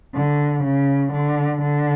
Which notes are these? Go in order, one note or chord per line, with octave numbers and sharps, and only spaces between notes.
D3
C#3
D3
D3